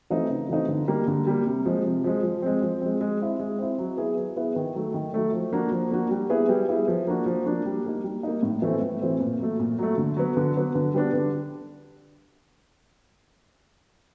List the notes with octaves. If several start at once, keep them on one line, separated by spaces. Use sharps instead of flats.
E3 A3 C4 D#4
C#3
E3 A3 C4 D#4
D3
G3 A#3
D3
G3 A#3
C3
F3 G#3
C3
F3 G#3
F3
G#3 C4
F3
G#3 C4
G#3
C4 E4
G#3
C4 E4
F#3
B3 E4 G#4
F#3
B3 E4 G#4
D#3
F#3 A3
D#3
F#3 A3
F3
A#3 D4 F#4
F3
A#3 D4 F#4
G3
B3 E4 G#4
G3
B3 E4 G#4
F3
A#3 D4 F#4
F3
A#3 D4 F#4
G3
A#3 D#4
G3
A#3 D#4
A2
E3 A3 C4
A2
E3 A3 C4
A#2
F#3 A3
A#2
F#3 A3
D3
F#3 B3
D3
F#3 B3
D3
G3 B3 D4
D3